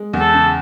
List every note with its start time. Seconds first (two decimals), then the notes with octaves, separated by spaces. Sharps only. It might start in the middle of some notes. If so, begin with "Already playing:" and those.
Already playing: G#3
0.13 E2
0.20 A4
0.34 C#3